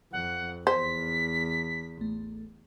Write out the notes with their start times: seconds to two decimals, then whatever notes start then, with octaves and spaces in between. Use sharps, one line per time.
0.12 F2 F#5
0.67 E2 C5 B6
1.98 A1 A3